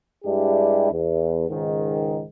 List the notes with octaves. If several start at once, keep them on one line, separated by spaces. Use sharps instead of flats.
G2 G#3 D4 E4 G4
E2
C#2 G#2 D#3